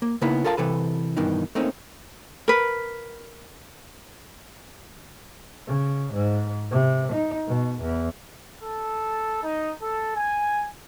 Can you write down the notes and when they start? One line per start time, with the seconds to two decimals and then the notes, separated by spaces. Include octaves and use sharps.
0.02 A#3
0.22 C#3 A#3 B3 D#4 E4
0.44 F4 A4 A#4 F5 A5
0.57 C3 E3 A4 B4
1.17 G2 B2 D#3 E3 D#4
1.55 A3 A#3 C4 C#4 D#4
2.48 A#4 B4
5.68 C#3
6.13 G#2
6.71 C3
7.13 D#4
7.47 B2
7.81 E2
8.63 A4
9.42 D#4
9.80 A4
10.15 G#5